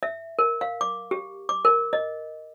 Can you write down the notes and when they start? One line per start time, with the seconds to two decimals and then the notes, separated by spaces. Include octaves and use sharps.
0.03 E5
0.39 A#4
0.61 F5
0.81 D6
1.11 G4
1.49 D6
1.65 A#4
1.93 D#5